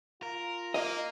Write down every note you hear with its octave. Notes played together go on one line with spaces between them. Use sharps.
F4 A#4
A#3 D#5